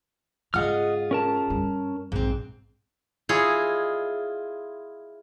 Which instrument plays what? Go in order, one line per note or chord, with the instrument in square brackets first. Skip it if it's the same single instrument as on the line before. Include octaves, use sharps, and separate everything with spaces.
[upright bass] G#2 C#3 [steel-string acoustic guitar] F4 G#4 [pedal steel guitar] D#5 F#5 F6
[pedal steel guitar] C#4 A#4 A5
[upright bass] G2
[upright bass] A#1 [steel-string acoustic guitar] G#2 C4
[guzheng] E4 F4 G#4 C#5 D#5